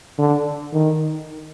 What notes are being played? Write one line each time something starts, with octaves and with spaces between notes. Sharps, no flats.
D3
D#3